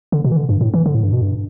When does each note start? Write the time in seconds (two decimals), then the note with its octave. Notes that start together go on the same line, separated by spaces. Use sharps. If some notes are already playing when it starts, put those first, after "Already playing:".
0.12 D3
0.24 B2
0.32 E3
0.37 D3
0.49 G2
0.61 A2
0.74 E3
0.86 D3
0.95 A2
1.04 G2
1.13 B2
1.22 G2